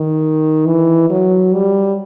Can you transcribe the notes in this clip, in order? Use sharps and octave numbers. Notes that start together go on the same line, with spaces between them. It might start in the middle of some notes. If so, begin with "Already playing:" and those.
Already playing: D#3
E3
F#3
G3